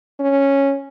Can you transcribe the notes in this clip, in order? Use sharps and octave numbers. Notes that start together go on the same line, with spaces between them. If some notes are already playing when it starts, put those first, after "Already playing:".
C#4